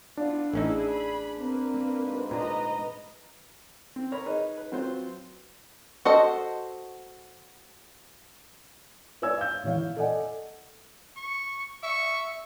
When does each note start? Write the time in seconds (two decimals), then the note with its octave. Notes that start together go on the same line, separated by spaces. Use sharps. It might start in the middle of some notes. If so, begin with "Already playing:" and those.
0.17 B3 D4 E4 F4
0.54 A1 C#4 D#4 E4 G#4
0.90 B5
1.40 A#3 C4 B4
1.98 D2 G#2
2.31 A#2 D4 B4 D#5 A#5
3.96 C4
4.12 A#4 C#5 A#5 B5
4.26 D#4 G#4 B4 C#5 D#5
4.58 B4
4.72 F#3 C4 F4 B4 C5
6.05 F#4 A4 C5 D#5
9.22 B4 C#5 D5 G#5 E6 G#6
9.38 F5 G6
9.63 A#2 E3 C#5 F5
9.97 A4 D5 D#5 F#5 G#5
11.17 C#6
11.83 E5 C#6